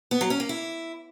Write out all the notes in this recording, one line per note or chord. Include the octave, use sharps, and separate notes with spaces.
B3
F#3
C#4
A#3
E4